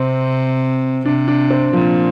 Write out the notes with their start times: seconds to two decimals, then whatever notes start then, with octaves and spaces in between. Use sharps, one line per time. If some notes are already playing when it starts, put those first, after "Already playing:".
Already playing: C3 C4
1.05 C3 D4
1.28 D4
1.50 C4
1.73 A#2 F3